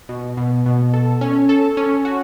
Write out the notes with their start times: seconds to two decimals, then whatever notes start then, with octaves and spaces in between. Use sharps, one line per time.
0.09 B2
0.37 B2
0.66 B2
0.94 A4
1.21 C#4
1.49 A4
1.77 C#4
2.05 F#4